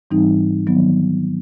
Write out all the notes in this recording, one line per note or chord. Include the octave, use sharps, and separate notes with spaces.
G#2 E3 G3 C4 D#4
D#3 F#3 B3